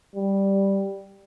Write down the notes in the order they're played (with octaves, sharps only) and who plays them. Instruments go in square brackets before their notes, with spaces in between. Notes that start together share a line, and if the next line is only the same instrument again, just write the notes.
[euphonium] G3